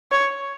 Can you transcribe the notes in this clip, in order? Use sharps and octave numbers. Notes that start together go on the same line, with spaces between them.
C#5